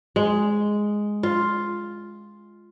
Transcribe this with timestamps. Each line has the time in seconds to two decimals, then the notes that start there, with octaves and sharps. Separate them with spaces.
0.16 G#3
1.23 F4